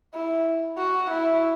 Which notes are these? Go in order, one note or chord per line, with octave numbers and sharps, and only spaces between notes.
E4
F#4
E4